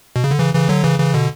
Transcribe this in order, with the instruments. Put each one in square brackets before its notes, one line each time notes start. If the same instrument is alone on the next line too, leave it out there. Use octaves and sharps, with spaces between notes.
[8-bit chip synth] B2
C#3
D3
C#3 E3
C#3 E3
D3 F#3
C#3 E3
C#3 E3
B2 D3